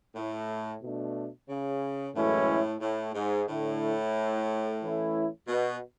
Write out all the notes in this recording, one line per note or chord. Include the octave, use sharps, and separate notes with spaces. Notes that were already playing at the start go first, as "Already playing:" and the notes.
A2
B2 A3 D4
C#3
F#2 A2 E3 G#3 C#4 E4
A2
G#2
A2 D3 A3 E4
E3 A3 C#4 E4
B2